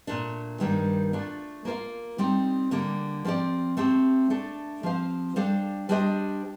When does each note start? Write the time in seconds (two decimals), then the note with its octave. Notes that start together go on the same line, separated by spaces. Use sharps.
0.07 A#2 A3 D4
0.60 G2 D#3 G3 A#3 D#4
1.13 A3 D4 F4
1.65 A#3 F4 C5 F5
2.18 G3 C4 D#4 G4
2.71 D3 G3 A#3
3.25 F3 C4 G4 D5
3.77 A3 C4 G4
4.30 A3 D4 A4
4.83 F3 C4 G4 C5 F5
5.36 G3 D4 A4 C5 F5
5.89 G3 D4 G4 C5 D#5